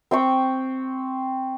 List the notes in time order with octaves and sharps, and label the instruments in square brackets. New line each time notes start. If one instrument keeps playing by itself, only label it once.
[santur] C4 G5 C#6